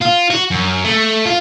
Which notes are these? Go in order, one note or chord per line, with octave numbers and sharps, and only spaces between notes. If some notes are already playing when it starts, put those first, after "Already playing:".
F4
F#4
F#2
A3
F4